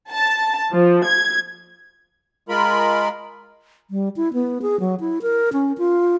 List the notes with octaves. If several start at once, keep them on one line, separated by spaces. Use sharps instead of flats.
A5
F3
G#6
G#3 F4 A#4 B5
G3
E4
B3
G#4
F#3
E4
A#4
C#4
F4